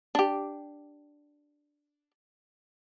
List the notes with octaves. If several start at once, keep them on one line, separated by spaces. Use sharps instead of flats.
D4 G4